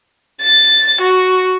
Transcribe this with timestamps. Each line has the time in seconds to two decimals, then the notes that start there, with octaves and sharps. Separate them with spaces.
0.42 A6
1.01 F#4